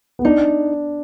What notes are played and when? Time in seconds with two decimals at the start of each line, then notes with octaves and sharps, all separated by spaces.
0.19 B3
0.25 D4 D#4